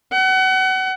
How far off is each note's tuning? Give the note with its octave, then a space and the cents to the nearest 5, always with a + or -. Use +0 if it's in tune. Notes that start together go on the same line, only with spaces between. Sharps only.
F#5 +30